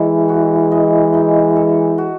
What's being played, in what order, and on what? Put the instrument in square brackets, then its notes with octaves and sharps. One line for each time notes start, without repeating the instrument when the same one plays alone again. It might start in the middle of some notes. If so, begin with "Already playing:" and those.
Already playing: [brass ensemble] E3 G#3 [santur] D#4 A4
[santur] F#4
D#5
D#4
A4
F#4